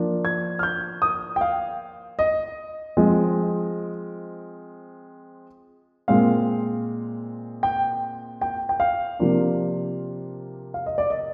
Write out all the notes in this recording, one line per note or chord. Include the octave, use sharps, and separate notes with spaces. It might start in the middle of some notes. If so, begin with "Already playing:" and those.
Already playing: F3 A#3 D4
G#6
F6
G6
D#6
G5
F5
D#5
F3 G#3 C4 D#5
A#2 G#3 C4 F5
G5
G5
G5
F5
C3 F3 A#3 D4 F4
F5
D#5
D5
D#5